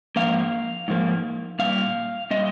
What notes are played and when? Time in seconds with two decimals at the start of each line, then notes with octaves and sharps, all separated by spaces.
0.16 G#2 F3 A#3 F5
0.88 G#2 F3 A#3
1.59 A#2 G3 F5
2.31 A#2 G3 D#5